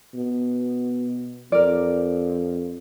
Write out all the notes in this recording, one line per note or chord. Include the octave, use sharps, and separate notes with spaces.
B2
F2 A#4 D5